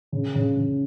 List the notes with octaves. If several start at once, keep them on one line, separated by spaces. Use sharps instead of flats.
C#3
C#3
C#3